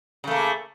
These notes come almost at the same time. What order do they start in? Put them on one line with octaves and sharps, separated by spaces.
C#3 A3 A#3